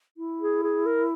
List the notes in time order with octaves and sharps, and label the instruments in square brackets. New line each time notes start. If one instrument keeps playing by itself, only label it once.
[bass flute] E4
[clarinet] G#4
G#4
A#4